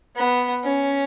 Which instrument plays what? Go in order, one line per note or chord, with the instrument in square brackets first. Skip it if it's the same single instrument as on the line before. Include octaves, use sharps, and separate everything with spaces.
[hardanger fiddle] B3
C#4